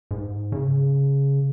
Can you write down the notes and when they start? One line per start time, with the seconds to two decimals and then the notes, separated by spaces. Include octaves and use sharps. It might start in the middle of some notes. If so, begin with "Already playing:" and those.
0.11 G#2
0.52 C#3